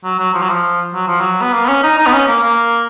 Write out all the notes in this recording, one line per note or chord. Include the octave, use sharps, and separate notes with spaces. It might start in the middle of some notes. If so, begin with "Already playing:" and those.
F#3
F#3
F3
F#3
F3
F#3
F3
F#3
B3
A#3
B3
C#4
D#4
D#4
B3
C#4
A#3
A#3